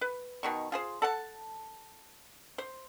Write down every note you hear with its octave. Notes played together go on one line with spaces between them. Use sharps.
B4
B2 D#3 C#6
F4 G#4 C5
A4 F#5 A5
C5